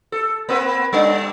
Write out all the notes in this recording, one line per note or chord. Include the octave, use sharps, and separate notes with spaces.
A4
A#3 C4 B4
G3 D4